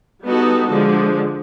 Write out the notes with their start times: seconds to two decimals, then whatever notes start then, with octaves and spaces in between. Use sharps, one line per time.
0.24 G3 B3 D#4 F#4 A4
0.71 D3 F3 G#3